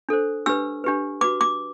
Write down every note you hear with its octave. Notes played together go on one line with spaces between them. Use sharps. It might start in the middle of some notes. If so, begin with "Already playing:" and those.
D4 A4 C5
D4 G4 B4 E6
D4 G4 B4
F#4 B4 D6
D6